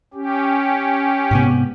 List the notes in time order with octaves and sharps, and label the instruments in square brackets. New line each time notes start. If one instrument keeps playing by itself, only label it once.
[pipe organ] C#4 G4
[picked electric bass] G#2 C3 B3